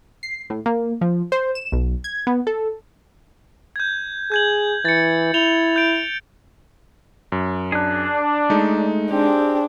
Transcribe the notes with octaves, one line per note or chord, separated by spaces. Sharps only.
C7
A2
A#3
F3
C5
E7
B1
G#6
B3
A4
G6 G#6
G#4 G6 G#6 F#7
E3 A6 C#7
E4 F7 G7
G6 D7
F#2
D4 G#4 F#6
G#3 A3 D#4
C4 D4 G4 G#4